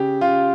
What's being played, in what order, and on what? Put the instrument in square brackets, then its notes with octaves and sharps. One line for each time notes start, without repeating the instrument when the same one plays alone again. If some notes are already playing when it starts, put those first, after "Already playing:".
Already playing: [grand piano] C#3 G4
C#3 F4